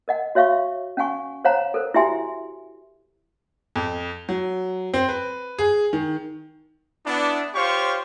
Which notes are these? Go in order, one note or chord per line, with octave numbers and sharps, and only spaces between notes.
A#4 D#5 F#5
F#4 C#5 E5 F5 C#6
C#4 F5 F#5 G#5 C#6
C5 C#5 F5 F#5 A#5
A4 A#4 C5
E4 F#4 G4 E5 G#5 C6
F2
F#3
C4
B4
G#4
D#3
B3 D4 E4
F4 G4 C5 C#5 F5 C#6